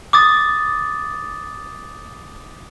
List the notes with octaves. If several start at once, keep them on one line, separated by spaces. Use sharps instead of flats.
D6 D#6 A6